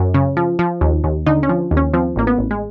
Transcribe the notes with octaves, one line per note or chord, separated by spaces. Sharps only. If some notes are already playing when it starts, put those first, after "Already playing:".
Already playing: F#2
C#3
F3
F3
D#2
D#2
D3 D#4
C#4
F3
D#2
C#4
F3 C4
A1 A#3
B3
A1
G#3